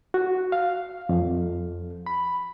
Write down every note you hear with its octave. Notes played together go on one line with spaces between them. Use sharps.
F#4
F5
F2
B5